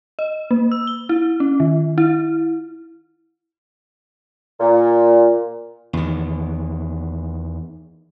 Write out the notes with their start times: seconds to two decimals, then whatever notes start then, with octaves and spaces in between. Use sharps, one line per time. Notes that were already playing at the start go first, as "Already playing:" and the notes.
0.19 D#5
0.51 A#3
0.72 E6
0.87 G7
1.09 E4
1.40 C#4
1.60 D#3
1.98 E4
4.60 A#2
5.93 E2 D#3